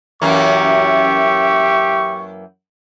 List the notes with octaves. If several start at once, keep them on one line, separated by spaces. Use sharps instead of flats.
F#2 E3 A#3 G4 E5 C#6